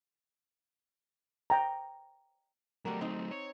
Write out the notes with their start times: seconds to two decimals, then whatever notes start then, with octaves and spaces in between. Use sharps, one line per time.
1.50 G5 A#5
2.85 F#3 G3 A3 F#4 A#4
3.01 C4 D#4
3.31 C#5